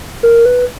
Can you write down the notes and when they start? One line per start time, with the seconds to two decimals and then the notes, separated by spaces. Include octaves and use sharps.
0.23 A#4
0.46 B4